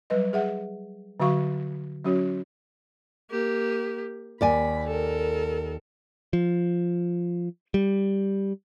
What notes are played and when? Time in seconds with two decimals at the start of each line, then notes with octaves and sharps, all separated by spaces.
0.10 F#3 G3 B4 D#5
0.33 G#4 E5 F#5
1.20 D3 F#3 F#4 F5 C#6
2.05 F#3 C#4 F#4 C#5
3.31 A#3 G4
4.41 D#2 D5 G#5 B5
4.88 A4 A#4
6.33 F3
7.74 G3